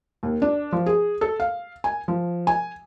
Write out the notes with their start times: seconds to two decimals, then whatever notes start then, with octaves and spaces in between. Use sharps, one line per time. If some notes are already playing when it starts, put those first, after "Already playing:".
0.23 D#2
0.42 D4
0.72 F3
0.86 G#4
1.21 A4
1.40 F5
1.84 G#5
2.08 F3
2.47 G#5